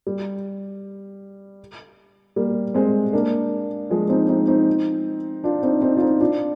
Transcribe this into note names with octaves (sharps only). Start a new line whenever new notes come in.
G3
G3 A#3
G#3 C4
A#3 D4
F3 G#3
C4 D#4
C4 D#4
C4 D#4
D4 F4
C4 D#4
C4 D#4
F4
C4 D#4
D4 F4